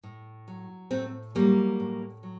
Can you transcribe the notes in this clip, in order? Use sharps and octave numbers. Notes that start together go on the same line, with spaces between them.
A2
F#3
A2 A3 C4
F#3 G3 A#3
A2
F#3